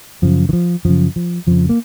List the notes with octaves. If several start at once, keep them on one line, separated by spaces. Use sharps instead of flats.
F#2 C#3 F3
D#3
F3
F#2 C#3 F3
F3
F2 C#3 F3
A#3